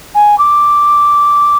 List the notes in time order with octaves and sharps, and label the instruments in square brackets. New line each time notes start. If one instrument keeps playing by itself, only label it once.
[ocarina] G#5
D6